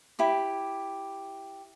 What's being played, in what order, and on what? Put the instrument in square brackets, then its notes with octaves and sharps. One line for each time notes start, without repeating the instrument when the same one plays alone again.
[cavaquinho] E4 G4 D6